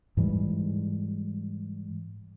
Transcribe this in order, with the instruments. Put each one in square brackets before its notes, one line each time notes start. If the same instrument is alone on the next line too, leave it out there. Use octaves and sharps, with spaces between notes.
[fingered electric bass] G#2 E3 G3 G#3